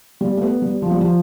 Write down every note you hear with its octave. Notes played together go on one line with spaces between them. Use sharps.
G3
A3
B3
G3
F3
G3
F3